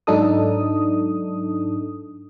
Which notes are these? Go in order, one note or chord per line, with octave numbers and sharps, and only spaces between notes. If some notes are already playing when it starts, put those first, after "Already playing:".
G#2 F#3 D4 D#4 A4 D#6